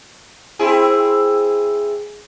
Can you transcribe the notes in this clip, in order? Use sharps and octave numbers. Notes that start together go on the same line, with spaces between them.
C4 E4 G#4